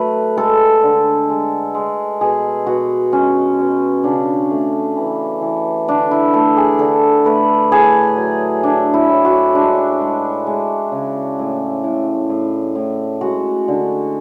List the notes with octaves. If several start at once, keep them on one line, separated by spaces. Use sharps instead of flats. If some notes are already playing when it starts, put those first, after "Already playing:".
Already playing: F#3 A3 B4
G#3 A4
D3
G#3
G#3
B2 G#4
B2 F#4
G#3 C#4
B2
C#3 D4
A3
E3
E3
D3 D4
E4
A3 A4
G#4
D3 A4
A3 B4
A2 G#4
F#3
A2 D4
E4
A2
F#4
G#3 D4
G#3
G#3
C#3
A2
A2
A2
A2
G#3 F#4
D3